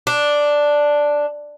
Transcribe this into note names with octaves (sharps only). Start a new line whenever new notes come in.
D4